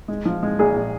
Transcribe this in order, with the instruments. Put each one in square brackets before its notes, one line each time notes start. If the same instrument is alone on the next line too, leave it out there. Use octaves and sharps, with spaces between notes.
[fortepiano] G#3
F3
G#3
[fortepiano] A#1 [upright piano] G#4
[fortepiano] A#2